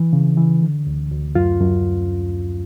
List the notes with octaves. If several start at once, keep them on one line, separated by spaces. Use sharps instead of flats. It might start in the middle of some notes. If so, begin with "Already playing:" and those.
Already playing: E3
C#3
E3
D3
D2
D2
F#2 F4
F#2